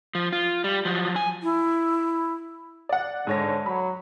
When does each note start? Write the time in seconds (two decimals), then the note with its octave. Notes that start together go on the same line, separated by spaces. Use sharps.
0.15 F3
0.33 F4
0.64 G3
0.85 F3 F#3
1.16 G#5
1.43 E4
2.89 D5 F#5
3.27 G#2 D3 C#5 A#6
3.66 F#3 B5